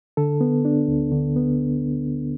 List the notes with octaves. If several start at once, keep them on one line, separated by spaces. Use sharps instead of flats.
D3 A4
B3
D4
D2
D3
B3